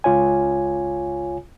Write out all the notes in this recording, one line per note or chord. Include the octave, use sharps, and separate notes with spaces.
C#2 F4 C#5 G#5